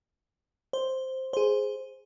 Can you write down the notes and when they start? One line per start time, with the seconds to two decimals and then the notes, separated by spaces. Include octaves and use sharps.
0.73 C5
1.33 G#4 C5